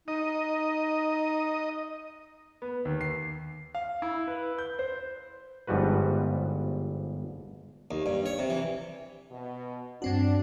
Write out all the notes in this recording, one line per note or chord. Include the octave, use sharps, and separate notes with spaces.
D#4 D#5
B3
D#2
C7
F5
E4
B4
G6
C5
G1 G#2 F3 G3 F#4 B4
D#2
G2
C#5
C3
E3
B2
G2 C4 D4 F#4